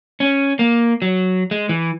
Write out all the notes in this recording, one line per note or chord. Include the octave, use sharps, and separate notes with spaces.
C#4
A#3
F#3
G#3
E3